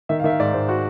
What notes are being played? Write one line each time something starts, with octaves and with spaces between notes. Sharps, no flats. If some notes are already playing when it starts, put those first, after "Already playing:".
D#3 E5
F5
D#3 E5
F5
G#2 D5
G#2 C5
F#4